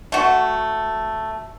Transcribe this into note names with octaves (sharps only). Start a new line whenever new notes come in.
A3 F#4